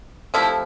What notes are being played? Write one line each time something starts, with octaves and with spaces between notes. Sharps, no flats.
C3 F3 A3 E4